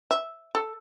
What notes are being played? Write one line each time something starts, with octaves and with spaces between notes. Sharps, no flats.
E5
A4